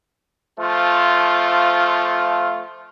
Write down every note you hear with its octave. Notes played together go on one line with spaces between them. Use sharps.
F3 A3 F4